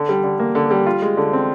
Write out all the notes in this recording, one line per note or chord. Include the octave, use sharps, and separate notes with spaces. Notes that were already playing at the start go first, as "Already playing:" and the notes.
Already playing: D3
G3
D3
A#3
D3
G3
F4
G#3
D3
C4